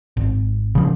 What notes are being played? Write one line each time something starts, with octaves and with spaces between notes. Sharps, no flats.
G#1
C#3 F3